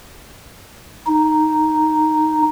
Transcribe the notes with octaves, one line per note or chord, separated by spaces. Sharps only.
D#4